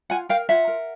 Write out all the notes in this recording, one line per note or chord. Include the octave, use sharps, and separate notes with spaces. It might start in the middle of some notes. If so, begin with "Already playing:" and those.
F4 F#5 G#5
A#4 F5 G5
F4 E5 F#5
A#4